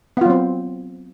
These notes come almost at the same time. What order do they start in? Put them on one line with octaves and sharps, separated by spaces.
B3 F4 F#3 C4